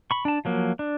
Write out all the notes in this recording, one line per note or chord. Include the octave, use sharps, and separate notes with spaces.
B5 C#6
D4 A5
F3 F#3 A#3
D4